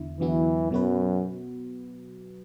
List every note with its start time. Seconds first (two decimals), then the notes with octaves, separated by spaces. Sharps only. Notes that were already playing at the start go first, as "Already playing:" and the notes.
Already playing: E2 D3 E4
0.20 E2 D3 E3 F#3 B3 E4
0.71 F#2 B2 F#3 B3 F#4 B4